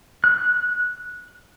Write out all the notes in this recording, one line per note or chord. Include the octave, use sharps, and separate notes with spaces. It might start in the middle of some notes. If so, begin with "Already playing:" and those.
F#6